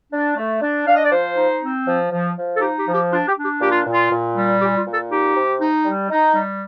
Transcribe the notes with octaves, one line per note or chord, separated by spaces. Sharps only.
D4
A3
D4
D4 F5
D#5
D5
F3 C5
D#4
C4
F3
F3
F3
A4
D#4 G4
G4
F3
G4
D4 F4
G4
D4
G4
A#2 G4
F4
A#2
F4
A#2
G3
A#2 G4
F4
A#2
A4
D#4 G4
C3
D#4
G3
D#4
G3